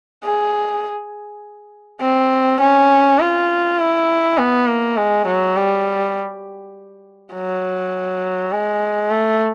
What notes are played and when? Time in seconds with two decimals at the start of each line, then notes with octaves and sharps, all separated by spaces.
0.25 G#4
2.01 C4
2.61 C#4
3.20 F4
3.79 E4
4.38 B3
4.67 A#3
4.97 G#3
5.27 F#3
5.56 G3
7.33 F#3
8.52 G#3
9.10 A3